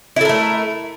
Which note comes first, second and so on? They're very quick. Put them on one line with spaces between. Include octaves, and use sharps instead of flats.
E4 A4 A#4 A3